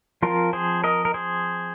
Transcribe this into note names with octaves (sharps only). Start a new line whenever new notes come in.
F3 C4 F4 A#4
G#4 C5
A#4 D#5
A#4
G#4 C5